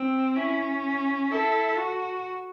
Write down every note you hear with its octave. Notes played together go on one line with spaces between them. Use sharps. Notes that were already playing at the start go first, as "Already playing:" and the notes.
Already playing: C4
C#4 E4
E4 A4
F#4